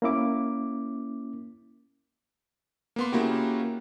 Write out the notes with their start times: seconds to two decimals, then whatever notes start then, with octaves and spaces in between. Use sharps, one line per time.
0.02 A#3 C#4 E4 D6
2.96 A#3 B3 C6
3.12 C#3 A#3 E4 F#4 G4